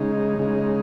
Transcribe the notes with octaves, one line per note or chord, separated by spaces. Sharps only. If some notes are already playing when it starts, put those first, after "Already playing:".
Already playing: C#3 G#3 D#4
C#3 G#3 D#4